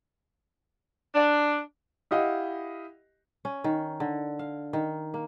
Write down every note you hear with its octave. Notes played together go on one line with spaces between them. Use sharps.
D4
E4 G4 D#5 F5 F#5
C#4
D#3
D3
F5
D#3
A#3